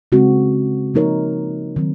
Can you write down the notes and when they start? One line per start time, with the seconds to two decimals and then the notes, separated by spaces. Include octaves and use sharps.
0.12 C#3 G#3 C4 F#4
0.94 F3 A#3 D#4 A#4 C#5
1.76 D#3 F#3 C4